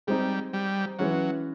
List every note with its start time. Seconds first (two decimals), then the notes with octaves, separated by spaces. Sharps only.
0.07 G3 G#3 C4 D#4
0.53 G3
0.99 E3 F#3 G#3 C#4